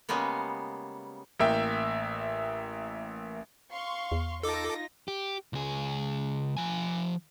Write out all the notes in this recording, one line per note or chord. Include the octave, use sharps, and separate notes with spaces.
C#3 G3 G#3 A#3 B3
A1 A#3 E5 G5
F5 C6 C#6
E2
D#4 F4 A4 D6 A#6
G4
C#2 G#4
F3 G#5